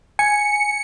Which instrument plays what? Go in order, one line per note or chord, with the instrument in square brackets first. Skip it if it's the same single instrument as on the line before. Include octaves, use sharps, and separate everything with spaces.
[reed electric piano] G#5 [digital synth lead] C#7